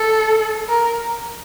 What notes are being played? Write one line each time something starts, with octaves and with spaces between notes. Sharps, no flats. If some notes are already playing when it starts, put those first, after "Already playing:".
Already playing: A4
A#4